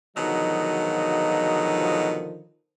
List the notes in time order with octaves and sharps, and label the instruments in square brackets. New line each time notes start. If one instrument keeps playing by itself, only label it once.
[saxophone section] G#2 B2 F#3 [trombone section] D3 D#3 F3 [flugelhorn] D#4